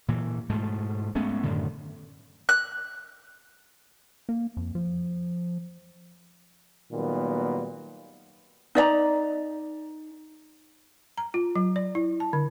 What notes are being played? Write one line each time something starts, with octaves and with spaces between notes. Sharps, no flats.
A#2 E3
G#2 B2 A3
G#3 A3 B3 C#4
F#2 A2 D3 D#3
F#6
A#3
F2
F3
A#2 D#3 F#3 G3 A#3 B3
D#4 D5 D#5 A#5
A#5
F4
F#3
D5
E4
A5
D3